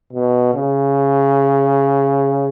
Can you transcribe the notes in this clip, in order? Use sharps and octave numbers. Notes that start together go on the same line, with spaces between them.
B2
C#3